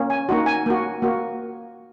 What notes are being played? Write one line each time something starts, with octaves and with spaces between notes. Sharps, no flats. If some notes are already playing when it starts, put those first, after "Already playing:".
Already playing: A#3 C#4
G#5
A#3 D#4 F#4
G#5
A#3 F#4
A#3 F#4